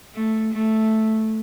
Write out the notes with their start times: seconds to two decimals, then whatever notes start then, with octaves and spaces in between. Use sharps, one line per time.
0.14 A3
0.53 A3